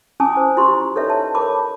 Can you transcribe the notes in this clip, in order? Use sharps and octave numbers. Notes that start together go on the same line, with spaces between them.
C#4 E4 G#5 A5 D6 D#6
C5
E4 F4 G4 C6 C#6
D#4 A4 B4 C#5 D#5 E5
A5
A#4 C#5 A5 B5 D6